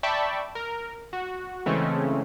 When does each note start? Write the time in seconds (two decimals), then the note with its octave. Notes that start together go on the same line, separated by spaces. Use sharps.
0.03 D5 E5 G5 A5 B5 C#6
0.55 A#4
1.13 F#4
1.66 C#3 E3 G#3 A3 C4 C#4